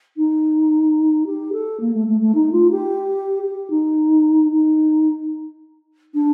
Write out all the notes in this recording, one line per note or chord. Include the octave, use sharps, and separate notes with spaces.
D#4
G4
A4
A#3
A3
A3
A3
D#4
F4
G4
G4
D#4
D#4
D4